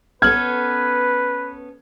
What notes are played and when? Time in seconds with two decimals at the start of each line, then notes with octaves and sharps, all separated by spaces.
0.22 B3 C#4 A4 B4 F6 G#6